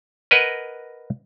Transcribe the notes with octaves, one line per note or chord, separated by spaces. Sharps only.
A#4 B4 D#5 F#5 G#5